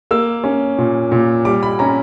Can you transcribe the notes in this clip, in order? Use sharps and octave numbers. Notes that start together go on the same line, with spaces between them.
A#3 E6
C#4
A#2
A#2
G3 D6
B5
C#4 A#5